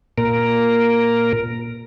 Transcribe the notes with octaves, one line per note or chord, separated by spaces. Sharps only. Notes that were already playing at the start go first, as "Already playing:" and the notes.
A#2 A#4